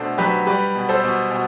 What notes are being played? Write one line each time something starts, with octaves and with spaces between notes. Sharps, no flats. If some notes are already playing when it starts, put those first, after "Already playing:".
Already playing: B2 A3 D4 A4 C5
F#3 G4 B4
G3 G4 B4
B2
A4 C5
B2
B2